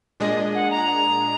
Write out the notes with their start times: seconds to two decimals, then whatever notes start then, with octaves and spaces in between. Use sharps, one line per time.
0.20 A#2 G#3 D4 G#4 D#5
0.55 F#5
0.71 A#5